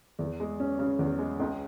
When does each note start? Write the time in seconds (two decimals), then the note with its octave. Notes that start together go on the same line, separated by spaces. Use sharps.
0.19 E2
0.40 G#3
0.60 C#4
0.79 C#3
0.99 E2
1.19 G#3
1.40 C#2